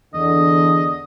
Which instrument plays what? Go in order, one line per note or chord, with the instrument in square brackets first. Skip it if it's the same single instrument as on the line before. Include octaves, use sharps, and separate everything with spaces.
[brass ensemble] E2 D3 [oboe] D#5